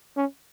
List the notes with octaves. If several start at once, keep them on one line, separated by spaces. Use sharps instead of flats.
C#4